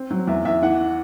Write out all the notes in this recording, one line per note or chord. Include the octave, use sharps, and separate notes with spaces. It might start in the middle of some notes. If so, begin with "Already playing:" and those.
Already playing: C4
F#3
E2 E5
E2 E5
E3 F#5